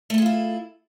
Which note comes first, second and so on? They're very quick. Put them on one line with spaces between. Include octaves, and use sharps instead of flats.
A3 A4 G#4 F4 E4